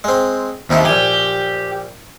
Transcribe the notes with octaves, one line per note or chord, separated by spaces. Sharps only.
G#3 C4
D#2 C3 D#4 E4
A#1 G4 G#5